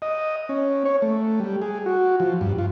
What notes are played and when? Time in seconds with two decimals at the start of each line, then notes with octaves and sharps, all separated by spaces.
0.02 D#5
0.49 C#4
0.85 C#5
1.02 A3
1.40 G3
1.62 G#4
1.86 F#4
2.20 F3
2.41 G2
2.58 F4